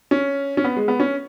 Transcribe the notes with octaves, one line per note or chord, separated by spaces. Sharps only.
C#4
C#4
B3
G#3
B3
C#4